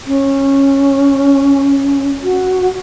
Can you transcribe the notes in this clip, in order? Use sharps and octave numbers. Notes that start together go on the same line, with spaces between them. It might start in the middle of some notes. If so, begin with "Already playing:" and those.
C#4
F#4